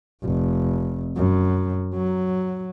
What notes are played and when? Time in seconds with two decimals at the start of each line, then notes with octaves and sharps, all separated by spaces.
0.24 F1
1.17 F#2
1.94 F#3